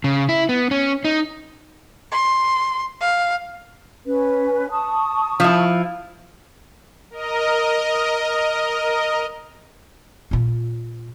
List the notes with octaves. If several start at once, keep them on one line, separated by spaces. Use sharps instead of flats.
C#3
E4
B3
C#4
D#4
C6
F5
C#4 B4
A5 C#6 D#6
F3 E4
A#4 D#5
A#2 F4